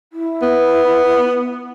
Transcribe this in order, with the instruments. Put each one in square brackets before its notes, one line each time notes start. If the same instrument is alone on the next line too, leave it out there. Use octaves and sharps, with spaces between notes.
[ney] E4
[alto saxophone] B3